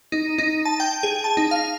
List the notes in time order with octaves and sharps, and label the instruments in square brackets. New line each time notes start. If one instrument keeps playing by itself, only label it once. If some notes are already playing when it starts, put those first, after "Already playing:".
[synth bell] D#4
D#4
A5
G5
G#4
A5
D#4
F5